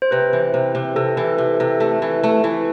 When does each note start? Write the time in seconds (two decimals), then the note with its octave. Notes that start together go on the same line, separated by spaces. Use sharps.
0.02 C5
0.11 C3 B4
0.33 E3
0.54 C3
0.75 C3
0.96 C3 A4
1.17 E3
1.38 C3
1.60 C3
1.80 A3
2.02 E3
2.23 A3
2.44 E3